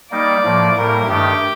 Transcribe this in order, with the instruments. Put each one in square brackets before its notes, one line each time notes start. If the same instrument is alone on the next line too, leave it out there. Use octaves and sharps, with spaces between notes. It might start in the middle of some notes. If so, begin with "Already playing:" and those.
[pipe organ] G3 A#3 D#4 [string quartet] D5
[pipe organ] A2 F3 A#3
[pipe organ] A2 G3 A#3 [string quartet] A#4
[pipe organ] G2 D#3 A3 [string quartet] G4